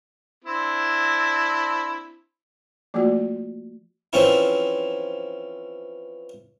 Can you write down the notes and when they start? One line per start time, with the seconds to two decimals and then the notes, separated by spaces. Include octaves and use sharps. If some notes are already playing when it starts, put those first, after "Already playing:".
0.44 C4 D4 E4
2.94 F3 A3 A#3 F4 F#4 D5
4.13 E3 F3 C4 C#4 E4